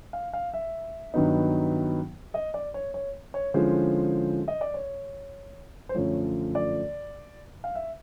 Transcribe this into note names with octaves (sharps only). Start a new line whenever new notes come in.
F5
F5
E5
G2 D#3 F#3 B3 D#4
D#5
D5
C#5
C#5
C#5
D3 F3 G#3 C#4 E4 C5
D#5
D5
C#5
C5
F#2 D3 F3 A3 C#5
D5
F5
E5